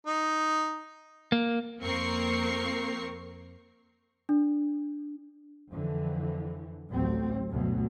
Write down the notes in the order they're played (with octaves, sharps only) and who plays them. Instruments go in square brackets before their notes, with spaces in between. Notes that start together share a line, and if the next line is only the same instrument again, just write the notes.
[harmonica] D#4
[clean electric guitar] A#3
[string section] F2 A#3 C4 A#4 C#6 C7
[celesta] D4
[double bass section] F2 D3 E3
A1 D2 F#3 C4
D2 G2 B2 F#3